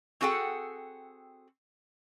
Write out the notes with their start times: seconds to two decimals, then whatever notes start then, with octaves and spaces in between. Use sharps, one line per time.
0.21 C4 F#4 G#4 A4 F#5 G5